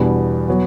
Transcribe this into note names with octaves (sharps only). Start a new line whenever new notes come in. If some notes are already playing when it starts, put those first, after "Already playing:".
Already playing: E2 B2 G3 B3 D4
F#3 B3